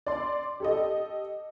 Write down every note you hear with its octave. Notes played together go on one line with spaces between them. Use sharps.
D5 C6
G4 A4 D#5